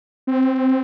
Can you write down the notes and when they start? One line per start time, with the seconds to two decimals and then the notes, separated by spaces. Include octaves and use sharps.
0.27 C4